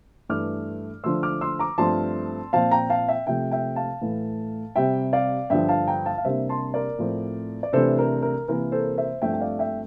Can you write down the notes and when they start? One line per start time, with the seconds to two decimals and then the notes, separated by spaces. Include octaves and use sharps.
0.29 G2 E3 A3 D6 F6
1.04 D3 F3 A3 C6 E6
1.23 D6 F6
1.41 C6 E6
1.59 A#5 D6
1.78 G2 F3 A3 C4 A5 C6
2.53 A#2 F3 C4 F5 A5
2.71 G5 A#5
2.90 F5 A5
3.08 E5 G5
3.27 C3 F3 A3 E5 G5
3.51 E5 G5
3.76 F5 A5
4.01 A2 E3 A3
4.76 C3 G3 C4 E5 G5
5.13 D5 F5
5.50 G2 D3 F3 E5 G5
5.69 F5 A5
5.87 G5 A#5
6.06 F5 A5
6.18 F5
6.24 C3 G3 A#3 D4 C5 E5
6.49 A5 C6
6.74 A#4 D5
6.99 A2 F3 C4
7.63 D5
7.73 C3 E3 A3 D4 A4 C5
7.99 A#4
8.22 A#4
8.48 C3 E3 A#3 A#4
8.72 A4 C5
8.97 C5 E5
9.22 G2 F3 A3 C4 E5 G5
9.33 G5
9.41 D5 F5
9.59 E5 G5